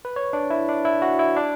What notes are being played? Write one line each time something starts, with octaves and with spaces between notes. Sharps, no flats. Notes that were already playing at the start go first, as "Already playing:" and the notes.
B4
C#5
D4
E4
D4
E4
F#4
E4
D4